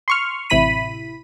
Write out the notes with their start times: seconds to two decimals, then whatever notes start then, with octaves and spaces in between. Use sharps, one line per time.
0.08 C6 C#6 F6
0.50 A1 C3 E4 B5 B6 D#7